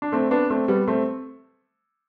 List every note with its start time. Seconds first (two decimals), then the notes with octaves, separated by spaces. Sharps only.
0.02 D4
0.12 A3 C4
0.31 B3 D4
0.50 A3 C4
0.68 G3 B3
0.88 A3 C4